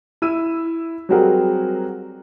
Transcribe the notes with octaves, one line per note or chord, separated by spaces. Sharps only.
E4 E6 D#7
F#3 G3 C4 F#4 G#4 A#4